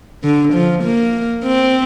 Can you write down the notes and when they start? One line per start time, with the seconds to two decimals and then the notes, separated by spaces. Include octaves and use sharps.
0.23 D3
0.53 F3
0.84 A#3
1.44 C4